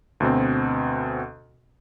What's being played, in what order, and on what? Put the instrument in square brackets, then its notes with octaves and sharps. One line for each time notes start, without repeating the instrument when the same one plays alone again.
[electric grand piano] D2 B2 C4